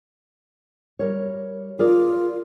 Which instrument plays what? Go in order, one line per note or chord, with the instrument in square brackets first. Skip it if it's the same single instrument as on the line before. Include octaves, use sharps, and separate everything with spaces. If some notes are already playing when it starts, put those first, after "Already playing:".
[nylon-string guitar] G3 A#4 C#5
[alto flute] F4 [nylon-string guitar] G#4 A#4 D5